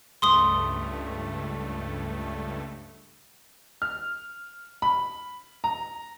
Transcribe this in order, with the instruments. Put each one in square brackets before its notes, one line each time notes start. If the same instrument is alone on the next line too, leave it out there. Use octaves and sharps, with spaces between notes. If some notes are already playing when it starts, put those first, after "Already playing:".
[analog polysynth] C#2 G2 A3 [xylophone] C6 D#6 G7
[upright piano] F6
B5
A#5